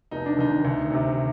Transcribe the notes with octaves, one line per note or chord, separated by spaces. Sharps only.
F1 D#4
D4
D#2 D#3 D#4
D2
C3 D#3